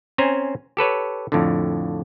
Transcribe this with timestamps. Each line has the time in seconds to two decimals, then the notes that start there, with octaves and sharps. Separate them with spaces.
0.18 C4 C#4 C5 G#5 A#5
0.77 G4 A4 B4 C#5
1.32 F2 A2 D3